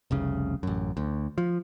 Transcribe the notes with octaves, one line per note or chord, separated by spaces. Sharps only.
F1 C2 C#3
A1 F#2
D2
F3